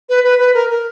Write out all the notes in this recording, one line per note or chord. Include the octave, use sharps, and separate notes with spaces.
B4
B4
B4
A#4
A#4